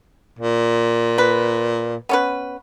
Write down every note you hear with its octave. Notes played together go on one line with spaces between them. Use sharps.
A#2
B4
B3 C#4 B4